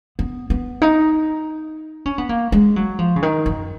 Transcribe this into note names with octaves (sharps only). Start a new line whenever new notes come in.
B3
B3
D#4
C#4
B3
A#3
G#3
F#3
F3
C#3
D#3
F#2